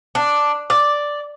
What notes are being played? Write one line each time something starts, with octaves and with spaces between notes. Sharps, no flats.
D4
D5